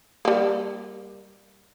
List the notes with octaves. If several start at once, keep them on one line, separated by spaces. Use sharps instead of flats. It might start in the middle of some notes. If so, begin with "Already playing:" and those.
G3 A#3